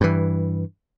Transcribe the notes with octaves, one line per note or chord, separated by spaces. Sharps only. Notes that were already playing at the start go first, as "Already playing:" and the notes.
G2 E3